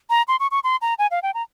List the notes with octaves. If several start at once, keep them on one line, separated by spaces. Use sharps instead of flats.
A#5
C6
C#6
C#6
C6
A#5
G#5
F5
G5
A#5